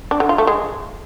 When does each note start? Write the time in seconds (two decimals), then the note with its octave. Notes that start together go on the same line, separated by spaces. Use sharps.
0.11 D4
0.20 D3
0.29 F4
0.38 A3
0.47 G#3